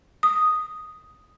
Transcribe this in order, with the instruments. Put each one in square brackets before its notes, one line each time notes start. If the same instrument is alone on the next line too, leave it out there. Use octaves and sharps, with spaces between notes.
[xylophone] D#6